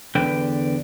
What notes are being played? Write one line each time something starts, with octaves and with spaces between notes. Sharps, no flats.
E2 D3 B4 G5